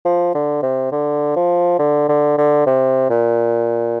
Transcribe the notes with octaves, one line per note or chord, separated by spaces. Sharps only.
F3
D3
C3
D3
F3
D3
D3
D3
C3
A#2